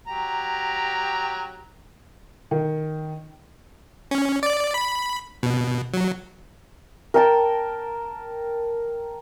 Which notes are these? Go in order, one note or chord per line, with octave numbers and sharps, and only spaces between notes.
F#3 G4 A#5
D#3
C#4
D5
B5
B2
F#3
A#4 G5 A5